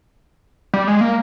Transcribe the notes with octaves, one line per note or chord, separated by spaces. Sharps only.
G3
G#3
A#3